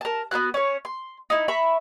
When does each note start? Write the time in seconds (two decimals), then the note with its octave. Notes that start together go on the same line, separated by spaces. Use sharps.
0.01 A#4 A5
0.31 B3 E4 F#4 F#6
0.54 C#4 C#5
0.85 C6
1.30 D#4 E4
1.48 E5 A#5 B5 C#6